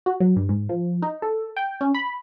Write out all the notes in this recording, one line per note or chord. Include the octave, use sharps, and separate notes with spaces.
F#4
F#3
G2
G#2
F3
D#4
A4
G5
C#4
B5